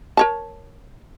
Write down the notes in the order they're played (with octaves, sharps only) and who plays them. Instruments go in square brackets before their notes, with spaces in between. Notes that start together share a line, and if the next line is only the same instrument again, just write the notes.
[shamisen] A#4 C#5 A5